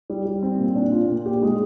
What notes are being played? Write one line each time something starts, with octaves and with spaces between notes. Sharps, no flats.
G3
G3
C4
A#2
D4
F4
A#2
G4
G#3